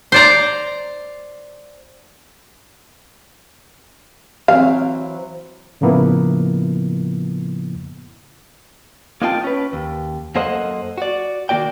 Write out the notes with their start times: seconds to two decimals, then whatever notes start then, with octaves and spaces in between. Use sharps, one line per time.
0.12 C5 D5 A#5
4.48 E3 F#3 C4 F5
5.81 A2 C#3 F3 A#3 B3 E4
9.22 A#3 C4 D#4 F4 G5 A5
9.44 C#4 B4
9.73 D#2
10.35 F#2 A#3 A4 C5 D#5 F#5
10.98 F#4 D5
11.49 D#3 A#3 B3 F#4 D5 G5